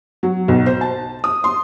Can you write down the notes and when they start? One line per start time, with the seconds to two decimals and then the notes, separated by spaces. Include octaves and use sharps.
0.23 F#3
0.48 B1
0.66 C5
0.81 A5
1.24 D#6
1.44 C6